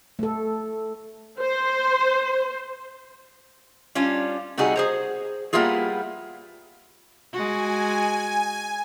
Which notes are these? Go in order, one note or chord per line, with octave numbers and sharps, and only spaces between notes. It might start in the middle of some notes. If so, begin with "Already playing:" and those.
A3 A4
C5
G3 C#4 D4 F4
C3 G3 D#4 F#4 G#4
G#4 C5 A#5
G3 A#3 B3 E4 F4 G#4
G#3 F#4 G#5